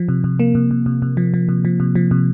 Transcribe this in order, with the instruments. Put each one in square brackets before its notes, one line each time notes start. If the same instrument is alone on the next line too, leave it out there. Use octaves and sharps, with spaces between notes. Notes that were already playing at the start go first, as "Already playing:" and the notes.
Already playing: [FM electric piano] F3
C3
C3
A#3
C3
C3
C3
C3
F3
F3
C3
F3
C3
F3
C3